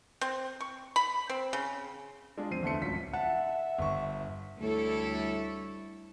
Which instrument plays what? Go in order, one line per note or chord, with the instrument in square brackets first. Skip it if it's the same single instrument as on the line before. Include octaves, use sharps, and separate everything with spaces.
[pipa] C4
C#6
B5
C4
C#3
[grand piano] G#3 D4 F4 D5
F2 C4 C7 D#7
E2 D3 A3 C6 C#7
D1 C#2 C#4 F4 B6
[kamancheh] E5 [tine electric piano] F#5 [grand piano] A5
[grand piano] G1 C#6
[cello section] D2 G3 E4 A4 C#5